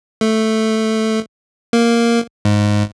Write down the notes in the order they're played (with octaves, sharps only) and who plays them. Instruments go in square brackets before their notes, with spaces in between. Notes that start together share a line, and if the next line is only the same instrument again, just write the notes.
[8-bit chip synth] A3
A#3
G#2